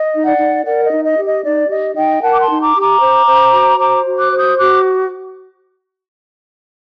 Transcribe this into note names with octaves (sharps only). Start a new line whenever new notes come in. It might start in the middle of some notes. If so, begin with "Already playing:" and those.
Already playing: D#5
D#4
D5 F#5
D#4
A#4 D5 F#5
D#5
D#4
D#5
G4
D#5
D#4 D5
G4 D#5
D#4 D#5 G5
A#4 F#5 A5
D6
A5 C6
D#4
A#5 D6
G4
A#5 D6
C5
C5
F#4
C5 A#5 D6
F#4
D6 F#6
C5
D#6 G6
F#4 D6 F#6